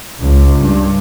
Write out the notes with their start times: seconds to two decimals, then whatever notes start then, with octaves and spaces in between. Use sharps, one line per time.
0.20 C#2
0.63 G2